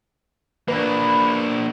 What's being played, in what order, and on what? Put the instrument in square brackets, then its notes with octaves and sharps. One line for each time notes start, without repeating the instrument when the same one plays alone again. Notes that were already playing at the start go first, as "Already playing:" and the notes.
[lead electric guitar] A#3 D4 [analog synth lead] B4